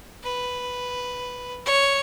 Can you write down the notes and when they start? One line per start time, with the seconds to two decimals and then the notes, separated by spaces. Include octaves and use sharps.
0.23 B4
1.66 C#5